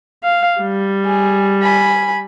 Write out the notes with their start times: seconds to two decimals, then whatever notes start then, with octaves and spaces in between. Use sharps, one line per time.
0.24 F5
0.61 G3
1.06 G#4
1.62 G#5 B5